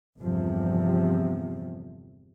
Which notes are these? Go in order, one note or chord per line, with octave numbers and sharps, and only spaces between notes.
G1 E2 C3 F3